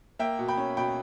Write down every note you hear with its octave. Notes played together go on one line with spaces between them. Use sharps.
A#3 E5 G5
B2
G5 B5
C#4
B2 G5 B5